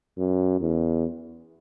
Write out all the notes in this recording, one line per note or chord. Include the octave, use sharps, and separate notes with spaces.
F#2
E2